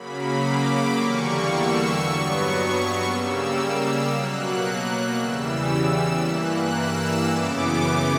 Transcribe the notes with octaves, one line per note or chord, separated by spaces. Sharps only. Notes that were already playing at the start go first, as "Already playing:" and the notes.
Already playing: C#3 F#3 A#3 B5
D6
E2 D3 G3 A#3 C#6
E6
G2 F#3 B3 C#6
C#6
C#3 G3 A#3 E6
B2 F#3 A#3 F#6
E2 C#3 E3 G3 E6
G2 E3 A#3 F#6
E6
F#2 C#3 E3 B3 D6